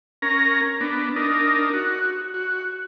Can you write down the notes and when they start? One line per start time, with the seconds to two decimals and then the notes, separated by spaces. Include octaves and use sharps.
0.22 C#4 A#4 A#5
0.81 B3 D4
1.16 D4 D#4 A#4
1.73 F#4
2.34 F#4